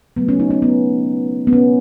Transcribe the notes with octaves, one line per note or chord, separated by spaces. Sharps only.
C#3 F#3 A3 B3
C#4
D#4
C#4
B3
B3
C#4